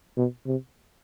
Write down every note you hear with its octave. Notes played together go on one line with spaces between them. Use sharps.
B2
C3